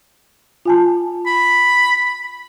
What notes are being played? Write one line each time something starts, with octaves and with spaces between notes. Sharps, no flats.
F4 G#5 A5
B5